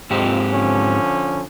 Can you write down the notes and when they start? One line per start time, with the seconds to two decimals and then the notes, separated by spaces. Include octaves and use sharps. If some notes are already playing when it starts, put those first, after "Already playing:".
0.11 F2 G#2 C4 G4
0.53 D3 F3 C#4